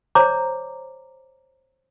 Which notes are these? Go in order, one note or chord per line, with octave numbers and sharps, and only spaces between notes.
C5 C#5 A#5 D6